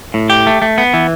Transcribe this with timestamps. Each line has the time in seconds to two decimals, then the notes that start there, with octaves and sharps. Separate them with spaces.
0.14 A2
0.30 G4
0.47 A3
0.62 A3
0.78 B3
0.94 E3